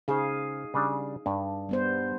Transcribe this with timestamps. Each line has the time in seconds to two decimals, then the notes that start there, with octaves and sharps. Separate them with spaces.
0.08 C#3 D#4 G#4 C5 F5
0.74 C#3 G3 D4
1.26 G2 D4
1.69 G3 B3 C5